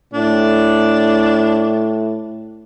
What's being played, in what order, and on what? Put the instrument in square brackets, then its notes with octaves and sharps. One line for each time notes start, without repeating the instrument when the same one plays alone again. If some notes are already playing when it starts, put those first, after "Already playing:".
[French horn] A2 [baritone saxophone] D4